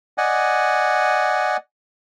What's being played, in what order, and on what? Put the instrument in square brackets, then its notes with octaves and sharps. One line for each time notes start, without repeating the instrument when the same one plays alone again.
[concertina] D5 D#5 F#5 G#5